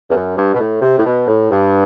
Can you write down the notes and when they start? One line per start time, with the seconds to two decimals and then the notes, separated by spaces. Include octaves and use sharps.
0.10 E2
0.14 F#2
0.36 G2
0.54 B2
0.59 A2
0.82 C3
0.97 A2
1.05 B2
1.27 A2
1.50 G2